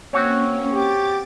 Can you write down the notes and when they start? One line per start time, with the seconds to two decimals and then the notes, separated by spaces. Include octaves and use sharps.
0.13 A#3 C4 C#4 F#4 C#5
0.73 G4 D6 A6